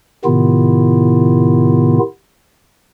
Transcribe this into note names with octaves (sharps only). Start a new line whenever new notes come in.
A2 C3 D#3 B3 E4 F4